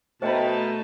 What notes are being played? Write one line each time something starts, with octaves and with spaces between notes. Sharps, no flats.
B2 A3 D#4 C5 D#5 G5 A5 B5